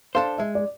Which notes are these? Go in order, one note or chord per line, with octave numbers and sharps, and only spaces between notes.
D4 A4 C5 F5
G#3 E5
D5